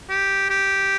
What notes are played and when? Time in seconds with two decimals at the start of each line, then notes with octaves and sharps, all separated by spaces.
0.10 G4
0.50 G4